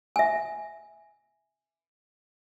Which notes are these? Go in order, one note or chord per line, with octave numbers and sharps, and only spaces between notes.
E5 G#5